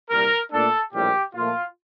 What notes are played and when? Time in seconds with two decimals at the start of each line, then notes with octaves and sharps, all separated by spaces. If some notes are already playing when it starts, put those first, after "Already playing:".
0.10 C2 A#2 G3 A#4
0.51 A#2 A3 D4 A4
0.93 A#1 A2 G3 G4
1.34 A#2 F3 A3 F4